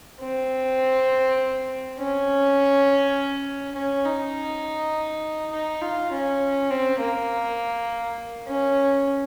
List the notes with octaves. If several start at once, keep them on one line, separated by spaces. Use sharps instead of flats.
C4
C#4
C#4
D#4
D#4
F4
C#4
C4
A#3
C#4